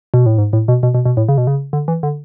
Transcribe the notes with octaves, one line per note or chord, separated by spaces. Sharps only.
B2
A2
G#2
A2
B2
B2
B2
B2
A2
C#3
B2
C#3
D3
E3
D3